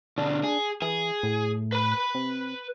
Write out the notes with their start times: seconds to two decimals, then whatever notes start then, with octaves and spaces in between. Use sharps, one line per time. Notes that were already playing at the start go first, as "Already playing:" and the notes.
0.18 B2 D3 D4
0.44 G#4
0.82 E3 G#4
1.23 A2
1.72 B4 B5
2.15 C3